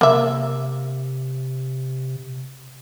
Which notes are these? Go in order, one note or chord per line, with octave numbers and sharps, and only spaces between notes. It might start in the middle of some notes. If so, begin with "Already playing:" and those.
C3 A#3 E5